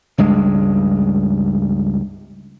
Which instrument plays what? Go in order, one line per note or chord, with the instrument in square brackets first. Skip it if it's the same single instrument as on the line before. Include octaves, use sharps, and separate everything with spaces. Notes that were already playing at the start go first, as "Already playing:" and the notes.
[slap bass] C#2 G2 G#3